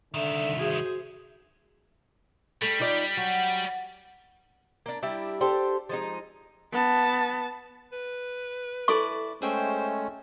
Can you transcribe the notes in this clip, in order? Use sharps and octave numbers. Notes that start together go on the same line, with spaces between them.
C2 D3 D#3 E5
F#4 G#4 C5
G3 A3
D#4 F4 D5
F#3 F#5
A#3 D4
G3 D4 E4 G4
D4 G4 A4 C5
F3 G#3 D#4
B3 A5
B4
E4 A4 D5 A5 C#6
G#3 A3 C#4 G#4 C5 E5 G5